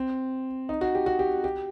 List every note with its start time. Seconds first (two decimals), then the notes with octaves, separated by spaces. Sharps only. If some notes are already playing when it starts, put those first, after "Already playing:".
Already playing: C4
0.69 D#4
0.81 F#4
0.95 G4
1.06 F#4
1.19 G4
1.44 G4